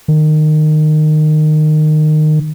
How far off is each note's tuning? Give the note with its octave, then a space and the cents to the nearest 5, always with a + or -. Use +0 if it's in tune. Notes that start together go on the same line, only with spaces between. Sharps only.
D#3 -20